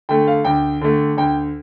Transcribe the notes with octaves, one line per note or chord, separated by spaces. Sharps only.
D3 A3 G5
F5
D2 G5
D3 A3
D2 G5